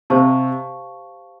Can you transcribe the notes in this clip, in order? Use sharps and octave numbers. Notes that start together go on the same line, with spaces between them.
C3 G4 C5 F5 A5 C#6